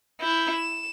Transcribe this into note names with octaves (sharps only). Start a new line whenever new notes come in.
E4 G6
E7